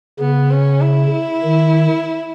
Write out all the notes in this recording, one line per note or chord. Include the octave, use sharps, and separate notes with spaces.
C#3 B3
C#4
E4
D#3